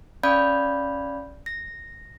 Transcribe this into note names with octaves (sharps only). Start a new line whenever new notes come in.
C#4 D5 F5 B5 G6
A#6